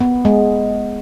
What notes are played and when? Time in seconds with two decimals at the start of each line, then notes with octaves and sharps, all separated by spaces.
0.01 B3
0.25 G#3